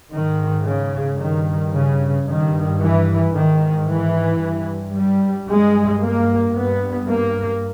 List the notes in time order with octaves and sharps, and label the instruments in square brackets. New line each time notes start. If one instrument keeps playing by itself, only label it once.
[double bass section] G#2 D#3
C#3
G2 D#3
C#3
G2 D#3
E3
G#2 D#3
E3
G2
G3
G2 G#3
A#3
G2 B3
A#3